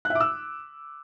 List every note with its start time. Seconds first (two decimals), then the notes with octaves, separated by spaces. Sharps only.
0.05 F#6
0.10 E5
0.15 D6
0.20 E6